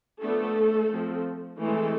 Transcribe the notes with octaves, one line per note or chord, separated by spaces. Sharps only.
F3 A3 B3 D4 A4
F3 A3 C4
E3 G#3 A3 C4 A4